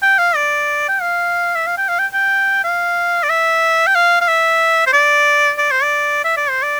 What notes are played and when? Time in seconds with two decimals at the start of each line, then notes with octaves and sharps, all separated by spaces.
0.02 G5
0.19 F5
0.35 D5
0.89 G5
1.01 F5
1.55 E5
1.66 F5
1.77 G5
1.88 F5
1.99 G5
2.14 G5
2.64 F5
3.23 D5
3.29 E5
3.87 G5
3.95 F5
4.21 F5
4.28 E5
4.87 C5
4.93 D5
5.58 D5
5.71 C5
5.83 D5
6.24 E5
6.37 D5
6.50 C5
6.63 D5